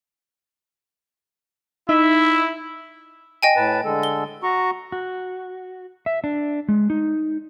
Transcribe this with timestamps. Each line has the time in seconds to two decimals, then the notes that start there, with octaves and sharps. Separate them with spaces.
1.89 D#4 E4 E5
3.43 D#5 G5 G#5
3.56 A2 B4 A5
3.85 D3 G#3 A4
4.03 G7
4.43 F#4 A#5 C#6
4.92 F#4
6.06 E5
6.24 D4
6.69 G#3
6.90 D#4